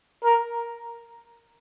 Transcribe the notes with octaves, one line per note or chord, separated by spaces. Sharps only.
A#4